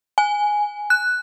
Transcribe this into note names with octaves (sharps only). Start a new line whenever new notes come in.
G#5
F#6